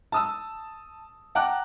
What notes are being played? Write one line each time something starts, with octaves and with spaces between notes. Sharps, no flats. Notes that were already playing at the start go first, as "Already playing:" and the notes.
A5 D#6 E6
F#5 G5 A5 A#5 D6 F#6